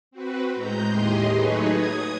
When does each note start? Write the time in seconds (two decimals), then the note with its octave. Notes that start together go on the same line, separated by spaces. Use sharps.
0.11 C4 F#4 B4
0.55 A2 G#3 A#5 G6
0.86 D#2 A2 G4 G#4 D#5 C6
1.33 F#3 A3 D#4 G#4 B4 C#5
1.69 D#6 G#6